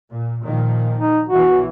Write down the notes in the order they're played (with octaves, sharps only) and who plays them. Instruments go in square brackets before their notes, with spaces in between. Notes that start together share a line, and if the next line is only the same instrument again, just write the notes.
[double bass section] A#2
A#2 D#3 F3
[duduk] D#4
[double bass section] B1 E3 [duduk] F#4